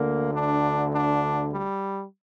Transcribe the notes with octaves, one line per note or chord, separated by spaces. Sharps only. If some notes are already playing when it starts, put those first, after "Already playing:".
Already playing: D2 D3 A#3
D4
D4
G3